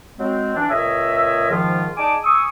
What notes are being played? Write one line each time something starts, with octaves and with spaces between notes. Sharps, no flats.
F#3 G#3 C4
E3 D4
C#2 A#2 G#4 C#5 D#5 E5
G#2 D#3 F3 F4
D#4 G#4 D5 G#5 A5 D6
G#5 C#6 D#6 E6